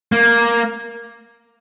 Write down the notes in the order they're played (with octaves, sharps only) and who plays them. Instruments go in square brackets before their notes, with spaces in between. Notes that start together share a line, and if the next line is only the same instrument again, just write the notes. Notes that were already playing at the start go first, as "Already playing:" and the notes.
[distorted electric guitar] A#3